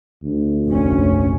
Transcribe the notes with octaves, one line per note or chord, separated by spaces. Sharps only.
D2
F1 A#1 C#4